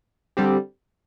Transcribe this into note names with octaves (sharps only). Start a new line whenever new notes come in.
D3 G3 C4 G4